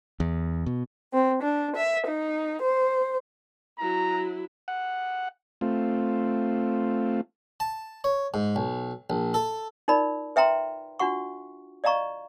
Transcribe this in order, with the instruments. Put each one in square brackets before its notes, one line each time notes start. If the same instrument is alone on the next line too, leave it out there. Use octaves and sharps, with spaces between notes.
[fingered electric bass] E2
B2
[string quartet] C4
D4
E5
D#4
C5
[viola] F#3 E4 [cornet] A#5
[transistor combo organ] F#5
A3 C4 F4
[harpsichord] A5
C#5
G#2
B1
A#1
A4
[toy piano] D#4 F4 A#4 D5 B5
B4 E5 G5 A#5 C6
D4 F4 F#4 F#5 C#6
D5 D#5 F5 A#5 C#6